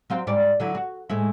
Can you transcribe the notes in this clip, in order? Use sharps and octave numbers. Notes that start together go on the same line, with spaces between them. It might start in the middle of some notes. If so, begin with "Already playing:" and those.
F#3 C4 F5
G#2 G3 D5
D3 F#3 E4
F#4
A2 G#3 E4